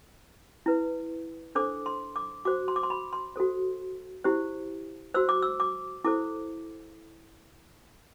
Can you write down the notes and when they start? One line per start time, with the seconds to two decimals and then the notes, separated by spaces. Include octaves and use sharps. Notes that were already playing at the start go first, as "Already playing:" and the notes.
0.66 E4 B4
1.55 D4 A4 C5 D6
1.86 C6
2.16 D6
2.45 F#4 C5 D6
2.68 C6
2.76 D6
2.83 C6
2.90 B5
3.13 C6
3.36 F#4 A4 C5
4.24 E4 G4 C5
5.14 F#4 C5 E6
5.29 D6
5.42 E6
5.60 D6
6.04 E4 A4 C5 D6